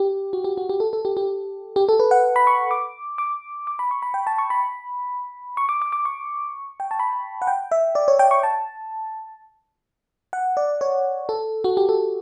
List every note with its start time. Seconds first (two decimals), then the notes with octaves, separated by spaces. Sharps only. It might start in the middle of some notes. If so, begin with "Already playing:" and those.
Already playing: G4
0.33 F#4
0.44 G4
0.57 F#4
0.69 G4
0.80 A4
0.93 A4
1.05 G4
1.17 G4
1.76 G4
1.89 A4
2.00 B4
2.11 F#5
2.36 B5
2.47 C#6
2.71 D6
3.18 D6
3.67 D6
3.79 B5
3.91 C#6
4.02 B5
4.14 G5
4.27 A5
4.38 C#6
4.50 B5
5.57 C#6
5.69 D6
5.82 D6
5.92 D6
6.05 C#6
6.80 G5
6.91 A5
6.99 B5
7.42 F#5
7.47 G5
7.72 E5
7.95 D5
8.08 C#5
8.19 G5
8.31 C#6
8.43 A5
10.33 F#5
10.57 D5
10.81 C#5
11.29 A4
11.64 F#4
11.77 G4
11.89 A4